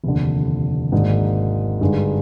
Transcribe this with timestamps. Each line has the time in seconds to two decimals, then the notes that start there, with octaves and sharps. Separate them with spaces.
0.03 F1 D#2 D3
0.92 G#1 G#2 D#3 A#3 D4
1.81 G2 D3 G#3 D#4